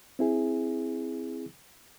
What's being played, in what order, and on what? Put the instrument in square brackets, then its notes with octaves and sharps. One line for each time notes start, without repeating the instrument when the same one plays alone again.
[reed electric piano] C4 E4 G#4